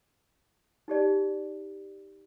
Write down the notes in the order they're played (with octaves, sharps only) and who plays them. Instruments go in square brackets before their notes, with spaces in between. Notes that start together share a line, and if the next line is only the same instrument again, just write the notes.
[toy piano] D#4 G4 D5